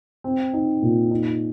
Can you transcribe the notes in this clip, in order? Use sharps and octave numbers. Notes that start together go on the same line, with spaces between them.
C4
D#4
A#2
D#4